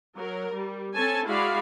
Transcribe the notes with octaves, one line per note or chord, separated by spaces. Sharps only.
F#3 A#4
G3
C4 C#4 A4 G#5 A5
G#3 E4 F#4 D5 F5 B5